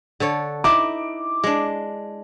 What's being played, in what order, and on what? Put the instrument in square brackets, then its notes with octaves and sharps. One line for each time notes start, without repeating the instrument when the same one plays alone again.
[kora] D3 A4 C#5
[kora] D#4 E4 [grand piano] D6
[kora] G#3 D4